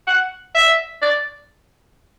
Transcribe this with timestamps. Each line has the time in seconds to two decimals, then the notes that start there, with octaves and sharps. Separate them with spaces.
0.07 F#5
0.55 E5
1.02 D5